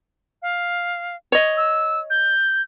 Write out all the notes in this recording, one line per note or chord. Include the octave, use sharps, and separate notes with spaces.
F5
C#5 D#5
E6
G6